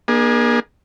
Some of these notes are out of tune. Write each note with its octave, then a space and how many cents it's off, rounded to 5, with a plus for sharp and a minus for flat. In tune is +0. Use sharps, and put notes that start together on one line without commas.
A#3 +40 D4 +35 G#4 +0